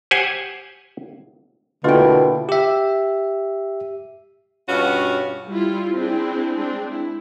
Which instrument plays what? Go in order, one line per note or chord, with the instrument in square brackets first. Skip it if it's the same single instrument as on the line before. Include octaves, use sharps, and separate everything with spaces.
[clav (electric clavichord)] G4 C5 F#5 G#5
[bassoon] B2 [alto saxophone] D3 [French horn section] A3 A#3 E4 [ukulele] F4 G5
[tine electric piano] G4 E5
[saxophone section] G2 B2 C#4 F4 F#4
[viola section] G3 E4 F4
C4 D4 E4 G#4
G#3 C4 D4
E4